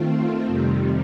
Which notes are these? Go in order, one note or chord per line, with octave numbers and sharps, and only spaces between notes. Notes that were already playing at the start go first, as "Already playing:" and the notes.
Already playing: D#3 A3 C4 F4
F2 C3 D#3 G3